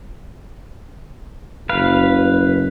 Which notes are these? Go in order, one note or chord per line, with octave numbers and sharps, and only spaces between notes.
F#1 B4 F5